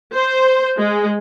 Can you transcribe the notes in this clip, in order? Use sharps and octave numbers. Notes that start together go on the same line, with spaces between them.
C5
G#3